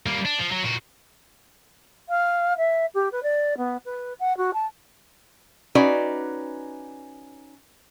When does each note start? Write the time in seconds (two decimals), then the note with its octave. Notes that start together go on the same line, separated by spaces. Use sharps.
0.06 G3 A#3
0.25 D4
0.39 F3
0.52 F#3
0.64 A#2 F#4
2.09 F5
2.57 E5
2.94 G4
3.12 B4
3.23 D5
3.58 B3
3.85 B4
4.20 F#5
4.37 F#4
4.54 A5
5.75 C#4 D#4 F#4 B4 D5